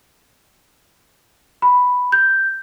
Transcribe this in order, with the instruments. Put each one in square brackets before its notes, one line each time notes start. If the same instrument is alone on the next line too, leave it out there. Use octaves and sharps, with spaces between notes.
[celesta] B5
G6